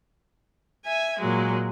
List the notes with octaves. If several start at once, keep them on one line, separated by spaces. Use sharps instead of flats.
E5 G#5
A#2 F#3 G#3